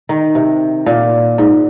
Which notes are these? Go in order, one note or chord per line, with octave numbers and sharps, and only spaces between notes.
D#3
C3
A#2
G#2